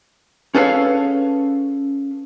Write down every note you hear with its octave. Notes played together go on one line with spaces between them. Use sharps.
C#4 G#4 A4 B4 C#5 F5